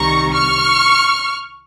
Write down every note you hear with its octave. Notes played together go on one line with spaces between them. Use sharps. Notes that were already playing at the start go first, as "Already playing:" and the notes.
Already playing: C2 C3 D#3 G3 A#5 C#6
C#6 F6